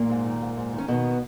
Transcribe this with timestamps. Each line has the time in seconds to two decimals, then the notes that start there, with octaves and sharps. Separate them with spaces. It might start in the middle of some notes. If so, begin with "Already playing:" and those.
Already playing: A#2 A#3
0.10 G#2
0.25 D#3
0.41 G#2
0.57 G#2
0.73 D#3
0.78 C#4
0.88 B2 D#3 B3